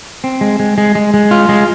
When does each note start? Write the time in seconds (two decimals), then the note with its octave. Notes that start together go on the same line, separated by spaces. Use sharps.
0.24 C4
0.41 G#3
0.60 G#3
0.78 G#3
0.95 G#3
1.14 G#3
1.31 F4
1.49 G#3